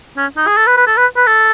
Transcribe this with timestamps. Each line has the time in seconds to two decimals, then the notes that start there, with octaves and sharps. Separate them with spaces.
0.17 C#4
0.37 D#4
0.47 G#4
0.57 A4
0.67 B4
0.77 B4
0.87 A4
0.97 B4
1.17 B4
1.27 A4